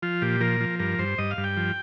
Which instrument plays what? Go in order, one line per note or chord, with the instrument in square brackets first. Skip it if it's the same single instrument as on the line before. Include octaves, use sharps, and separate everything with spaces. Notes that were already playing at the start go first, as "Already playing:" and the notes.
[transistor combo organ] F3 F4
A#2 G4
F3 A#4
F3
G2 A#4
G2 C5
G2 D#5
F5
G2
G5
F3